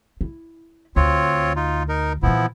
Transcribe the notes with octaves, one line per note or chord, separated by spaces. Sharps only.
E4
D2 C4 F4 C#5
D#4 F4
D#4 A#4
A#2 E3 F3 B3 E4